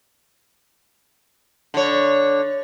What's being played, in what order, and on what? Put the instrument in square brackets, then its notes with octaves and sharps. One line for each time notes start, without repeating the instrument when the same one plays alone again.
[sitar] D3 C#5